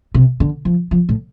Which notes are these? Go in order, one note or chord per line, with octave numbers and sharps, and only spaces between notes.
C3
D3
F3
F3
A2